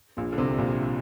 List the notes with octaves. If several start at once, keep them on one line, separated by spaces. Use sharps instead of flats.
A#1 A#2
D3
C2 C3
A#1 A#2